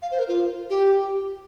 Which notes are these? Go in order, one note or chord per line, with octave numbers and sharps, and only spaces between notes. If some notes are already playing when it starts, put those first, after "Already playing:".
F5
C5
A#4
F4
G4